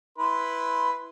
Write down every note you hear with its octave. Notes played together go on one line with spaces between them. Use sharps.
E4 B4 C6